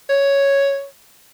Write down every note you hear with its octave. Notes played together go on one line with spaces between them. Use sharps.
C#5